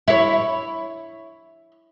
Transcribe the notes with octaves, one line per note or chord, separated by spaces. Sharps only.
E4 C#5